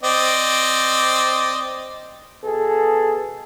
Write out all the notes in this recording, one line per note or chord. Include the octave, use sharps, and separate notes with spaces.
C4 D5 D#5
B2 G#4 A4